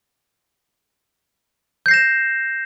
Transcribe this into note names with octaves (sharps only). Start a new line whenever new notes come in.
G6 A#6 C7 E7